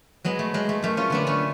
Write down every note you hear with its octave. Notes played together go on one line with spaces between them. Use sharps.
F#3 G#3 B3
A3
F#3 G#3
A3
F#2 A3
C#4 F4
D3 B3 D4
A3 C#4